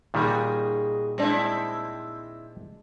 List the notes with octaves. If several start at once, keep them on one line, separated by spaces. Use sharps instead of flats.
A#2 D#3 G3 D#4 F#4 G#4
G#3 C4 D4 E4